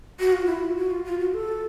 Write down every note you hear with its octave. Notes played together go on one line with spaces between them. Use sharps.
F#4
F4
E4
F4
F#4
F4
F4
F#4
A4